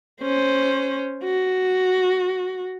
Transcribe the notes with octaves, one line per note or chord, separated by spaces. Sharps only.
C#4 C5
F#4